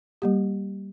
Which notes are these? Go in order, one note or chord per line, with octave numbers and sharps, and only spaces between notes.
G3 A#3 G4